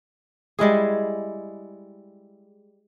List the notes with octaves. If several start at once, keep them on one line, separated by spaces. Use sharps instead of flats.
G3 G#3 E4 G#4